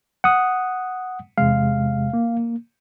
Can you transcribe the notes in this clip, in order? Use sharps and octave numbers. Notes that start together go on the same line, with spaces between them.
F#5 D#6
E2 C3 G#3 F5
A#3